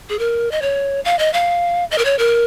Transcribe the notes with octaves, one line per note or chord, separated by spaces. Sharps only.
G#4
A#4
D#5
C#5
F5
D#5
F5
D#5
A#4
C#5
A#4